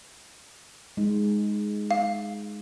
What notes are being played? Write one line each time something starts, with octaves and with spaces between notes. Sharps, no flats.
G#3 D#4
F5